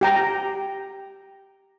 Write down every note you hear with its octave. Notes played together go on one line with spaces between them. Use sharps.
G4 G5 A#5